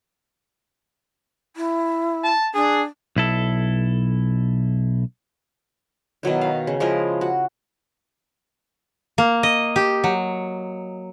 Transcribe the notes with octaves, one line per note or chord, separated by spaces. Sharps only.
E4
A5
D4 G#4
B1 E4 A4
B2 D#3 F#3 E4
F5
C#3
F3 G#3 E4 A#4
F#4
A#3
D#5
G4
F#3